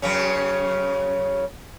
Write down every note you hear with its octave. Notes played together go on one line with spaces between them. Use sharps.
F#2 C#3 C#4